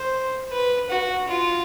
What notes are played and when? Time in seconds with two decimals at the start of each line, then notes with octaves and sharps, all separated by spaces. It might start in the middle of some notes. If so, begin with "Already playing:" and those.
Already playing: C5
0.52 B4
0.90 F#4
1.28 F4